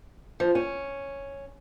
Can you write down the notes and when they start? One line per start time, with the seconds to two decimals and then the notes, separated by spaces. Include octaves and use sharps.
0.40 F3
0.55 C#4